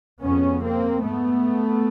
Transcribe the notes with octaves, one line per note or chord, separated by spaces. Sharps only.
F2 C#3 B3 C#4
A#3 C4
G#2 A3 B3